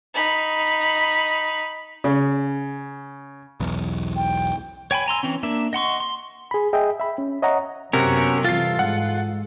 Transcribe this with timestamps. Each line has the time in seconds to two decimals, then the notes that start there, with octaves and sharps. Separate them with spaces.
0.14 D#4 B5
2.04 C#3
3.60 B1 E2
4.16 G5
4.91 C#5 G5 G#5 B5
5.06 G#5 A#5 C6 E6
5.23 E3 C4 C#4
5.43 A#3 D4 E5
5.73 D#5 F#5 C6 C#6
6.00 C6
6.51 G#4 B5
6.73 G#4 D#5 E5 G5
6.99 E5 B5
7.18 C#4
7.42 C#5 D#5 E5 F#5 A#5
7.93 F#2 C3 B3 C#4 F#4 A#4
8.44 C3 E3 G3 F4 A4 F6 A6 C7
8.79 G#2 F#5